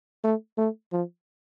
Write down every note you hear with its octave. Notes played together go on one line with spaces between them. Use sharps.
A3
A3
F3